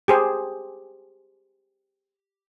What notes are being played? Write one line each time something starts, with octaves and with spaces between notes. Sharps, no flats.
G4 G#4 C5